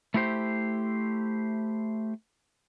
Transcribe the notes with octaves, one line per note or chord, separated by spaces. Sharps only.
A3 E4 G4 C5